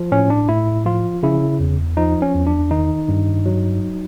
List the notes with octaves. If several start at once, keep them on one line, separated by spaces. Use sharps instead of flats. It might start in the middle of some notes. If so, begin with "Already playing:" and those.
Already playing: F3
A2 C#4
D4
A2 E4
F3 F4
C#3 E4
E2
F3 D#4
C#4
E2
D4
D#3 D#4
G2
F#3